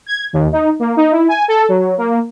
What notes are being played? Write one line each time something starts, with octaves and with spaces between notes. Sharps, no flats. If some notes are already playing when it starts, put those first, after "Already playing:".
G#6
D#2
D#4
A#3
D#4
E4
G#5
A4
F#3
A#3